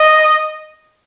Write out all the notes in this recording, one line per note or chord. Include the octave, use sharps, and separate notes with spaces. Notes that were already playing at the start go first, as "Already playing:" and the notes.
Already playing: D#5